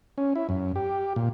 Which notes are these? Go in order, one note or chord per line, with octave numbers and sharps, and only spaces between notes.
C#4
E4
F#2
G4
A#2